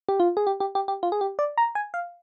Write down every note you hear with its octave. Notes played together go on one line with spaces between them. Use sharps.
G4
F4
G#4
G4
G4
G4
G4
F4
G#4
G4
D5
A#5
G#5
F5